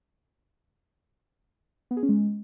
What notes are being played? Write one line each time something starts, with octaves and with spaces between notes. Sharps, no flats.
B3
G#4
C#4
G#3